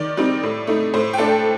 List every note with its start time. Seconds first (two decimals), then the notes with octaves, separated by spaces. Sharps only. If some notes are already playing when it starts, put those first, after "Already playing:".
Already playing: D#3 D5
0.17 G3 C4 D#4
0.43 A2
0.67 A3 D#4
0.94 A2 C5
1.13 G5
1.18 A3 D4 A4 A5